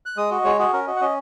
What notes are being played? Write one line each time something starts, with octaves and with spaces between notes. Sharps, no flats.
F#6
G#3 D#6
F#4 D#5
G#3 C#5
F#4 G#4
C#4 A#4
F#4 D#5
F#5
C#4 D#5